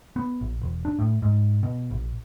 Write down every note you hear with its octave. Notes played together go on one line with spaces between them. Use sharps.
B3
A#1
E1
D4
A2
G#2
B2
A#1